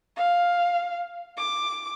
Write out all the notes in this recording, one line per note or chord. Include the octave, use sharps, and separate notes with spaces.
F5
D6